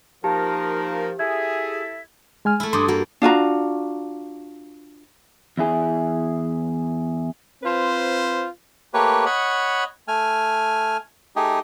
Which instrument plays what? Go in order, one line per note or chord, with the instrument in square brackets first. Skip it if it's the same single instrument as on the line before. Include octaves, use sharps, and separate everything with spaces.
[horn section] F3 [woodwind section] A#3 D#4 A#4 [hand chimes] G4 [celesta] A5
[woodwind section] E4 A4 E5 [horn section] G#4 [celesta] G#6
[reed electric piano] G#3 G#5 F6
[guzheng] A3 E4
[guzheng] G2 [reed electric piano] C6 D6 D#6
[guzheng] A#3 [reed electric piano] F#4
[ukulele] D4 F4 F#4 A#5
[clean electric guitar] E2 E4 G#4
[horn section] C4 F4 B4 C5
[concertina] A3 A#3 G4 B4 C#5
C#5 D#5 F#5 B5
A3 G#5 F6
A3 D#4 G4 G#4 D#5